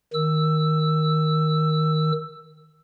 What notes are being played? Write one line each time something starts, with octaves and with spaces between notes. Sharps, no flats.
D#3 E6